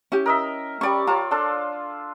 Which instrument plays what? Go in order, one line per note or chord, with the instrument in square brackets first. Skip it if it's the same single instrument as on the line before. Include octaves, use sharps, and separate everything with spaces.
[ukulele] C#4 E4 G4
[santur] A#4 D#5 E5
[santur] G3 D5 C#6 [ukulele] C#4 B5
[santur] F4 [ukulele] C#5 A5 A#5
[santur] D4 F4 A4